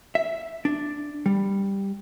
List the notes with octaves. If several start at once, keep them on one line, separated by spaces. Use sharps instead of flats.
E5
D4
G3